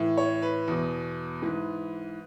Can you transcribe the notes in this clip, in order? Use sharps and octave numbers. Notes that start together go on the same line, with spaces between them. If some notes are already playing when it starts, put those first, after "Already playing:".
Already playing: A2 E3
C#5
B4
E2 B2
G#2 E3